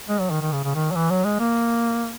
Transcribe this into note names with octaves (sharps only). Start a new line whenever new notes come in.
G#3
F#3
D#3
D#3
C#3
C#3
D#3
F#3
E3
F#3
G#3
A#3